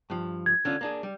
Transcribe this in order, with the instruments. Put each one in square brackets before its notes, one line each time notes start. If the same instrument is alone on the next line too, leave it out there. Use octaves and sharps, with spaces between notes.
[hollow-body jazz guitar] G2 F3
[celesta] G#6
[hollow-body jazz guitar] D3 C#4 F4
A#3 D4 G#4
G3